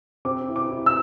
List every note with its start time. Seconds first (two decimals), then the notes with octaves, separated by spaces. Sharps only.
0.25 C4 D6
0.48 E4
0.56 D6
0.71 E4
0.86 E6